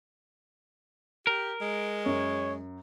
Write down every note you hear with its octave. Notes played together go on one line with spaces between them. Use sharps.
G4 A#4
G#3
F#2 C#5